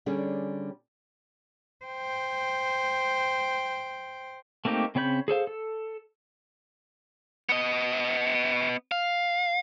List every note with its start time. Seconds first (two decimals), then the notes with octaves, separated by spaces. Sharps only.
0.06 D3 G3 C#4 G#4 C#5
1.85 C5 G5
4.65 A3 A#3 C4 D#4 G4
4.95 C#3 C4 C#5 B5 G6
5.28 G#4 A4 C5 F5
5.47 A4
7.49 B3 D#5
8.92 F5